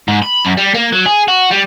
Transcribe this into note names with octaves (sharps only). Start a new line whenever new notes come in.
G#2
B5
F#2
G3
A#3
F#3
G#4
F#4
G3